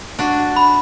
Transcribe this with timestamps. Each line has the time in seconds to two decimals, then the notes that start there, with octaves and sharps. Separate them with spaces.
0.19 D4 F#4
0.56 B5